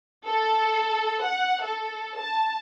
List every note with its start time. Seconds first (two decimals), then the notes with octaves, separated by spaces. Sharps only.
0.25 A4
1.22 F#5
1.61 A4
2.18 A5